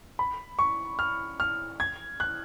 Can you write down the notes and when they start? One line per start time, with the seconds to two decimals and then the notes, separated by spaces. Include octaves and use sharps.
0.19 B5
0.59 C#6
0.99 F6
1.40 F6
1.80 G#6
2.20 F#6